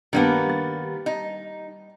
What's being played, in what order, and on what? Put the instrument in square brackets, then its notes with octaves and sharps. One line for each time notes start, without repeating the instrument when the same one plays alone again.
[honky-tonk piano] G2 G3 D4 [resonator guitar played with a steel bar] D#3 A#3 B3
[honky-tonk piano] G3 A6
[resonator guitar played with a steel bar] D#4